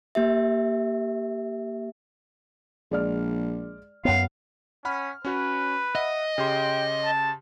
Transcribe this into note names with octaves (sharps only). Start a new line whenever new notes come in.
A#3 G4 E5
A#1 G#3 D5 F6
F#2 B3 C#5 F5 F#5
C#4 F#5 B5 F6
C#4 F#4 B4 C#5
D#5 E5 F#5
C#3 G4 G5 C6
A5